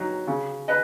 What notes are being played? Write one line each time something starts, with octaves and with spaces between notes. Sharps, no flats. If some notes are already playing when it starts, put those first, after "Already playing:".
Already playing: F#3 D#4
C#3
B4 D#5